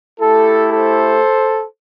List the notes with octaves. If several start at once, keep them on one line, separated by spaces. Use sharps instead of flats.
A3 E4 G4 A4
A4 C5